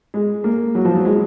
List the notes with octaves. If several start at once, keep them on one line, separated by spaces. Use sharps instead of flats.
G#3
A#3
F#3
F3
F#3
G#3